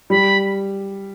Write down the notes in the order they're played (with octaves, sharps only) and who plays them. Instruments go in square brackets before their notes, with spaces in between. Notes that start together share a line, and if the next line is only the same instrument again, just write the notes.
[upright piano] G3 [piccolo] B5